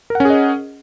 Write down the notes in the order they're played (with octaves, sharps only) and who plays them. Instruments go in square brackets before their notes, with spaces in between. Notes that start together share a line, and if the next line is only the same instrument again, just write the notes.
[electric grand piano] A#4
F#5
C#4
G#4
D#5